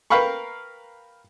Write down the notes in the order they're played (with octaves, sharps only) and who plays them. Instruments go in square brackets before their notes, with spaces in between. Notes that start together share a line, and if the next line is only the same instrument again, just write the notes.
[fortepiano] A#4 B4 F5 G5 B5 C#6